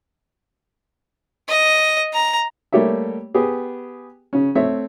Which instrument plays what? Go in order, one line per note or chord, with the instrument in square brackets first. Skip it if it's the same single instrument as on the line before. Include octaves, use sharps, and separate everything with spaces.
[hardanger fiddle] D#5
A#5
[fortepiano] G3 A3 A#3 G4 C#5 E5
B3 G4 G#4
C#3 C#4
A3 C4 C#5 E5